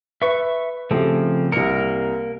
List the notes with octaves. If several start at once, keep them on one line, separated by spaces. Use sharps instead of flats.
B4 E5 C#6
C#3 F3 A3 C4 G4
C2 A#3 A#4 C#7